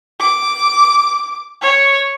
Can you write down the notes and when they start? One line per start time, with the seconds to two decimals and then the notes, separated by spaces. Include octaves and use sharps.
0.20 D6
1.62 C#5